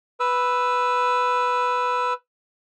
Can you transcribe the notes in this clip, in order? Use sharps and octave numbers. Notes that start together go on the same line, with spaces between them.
B4 E6